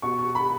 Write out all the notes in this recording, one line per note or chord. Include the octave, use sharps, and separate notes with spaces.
B2 C#6
C#6
B5